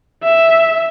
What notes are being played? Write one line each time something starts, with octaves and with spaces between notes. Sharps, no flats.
E5